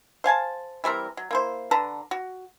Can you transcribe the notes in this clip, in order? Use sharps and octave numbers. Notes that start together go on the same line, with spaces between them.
C5 F5 G#5 A5
E3 G3 C4 A#4
F#3
A#3 E4 C5
D3 B4 A5 A#5
F#4